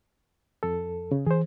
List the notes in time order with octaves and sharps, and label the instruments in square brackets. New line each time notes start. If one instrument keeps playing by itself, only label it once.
[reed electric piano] F2 A4
C#3
[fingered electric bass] E3 [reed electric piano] G#4 C5